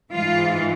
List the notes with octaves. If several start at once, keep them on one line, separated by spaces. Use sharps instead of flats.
G#2 E3 F4